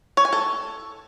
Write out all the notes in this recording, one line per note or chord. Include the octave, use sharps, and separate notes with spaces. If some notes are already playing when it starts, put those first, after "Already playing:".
C#5
G#5
A4